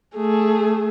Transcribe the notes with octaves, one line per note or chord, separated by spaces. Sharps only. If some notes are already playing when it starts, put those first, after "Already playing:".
A3 G#4